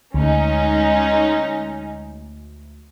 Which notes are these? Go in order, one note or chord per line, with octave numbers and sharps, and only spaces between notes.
D2 G#3 C#4 D#4